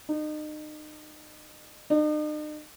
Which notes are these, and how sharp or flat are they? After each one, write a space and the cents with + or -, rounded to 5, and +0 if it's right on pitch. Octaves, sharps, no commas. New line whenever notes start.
D#4 -35
D#4 -45